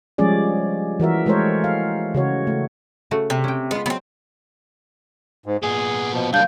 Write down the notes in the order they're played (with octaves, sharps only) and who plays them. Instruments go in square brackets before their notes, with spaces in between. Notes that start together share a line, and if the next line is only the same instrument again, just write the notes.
[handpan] F3 G3 G#3 C#4 G#4 D5
E3 F#4 A#4 E5
G#3 A3 A4 A#4 C5 C#5
F5
C#3 F#4 C#5
A3
[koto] C#3 A3 F#4
[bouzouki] C3
[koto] C#4 G5
[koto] G#3 F4 [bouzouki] B3
[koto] F#3 [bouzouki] B3 C4
[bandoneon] G#2
[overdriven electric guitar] A#2 B3 [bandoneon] G#4
[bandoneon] B2 F3
[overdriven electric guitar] F#3 A#3 [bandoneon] G3 D4 [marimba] F5 G6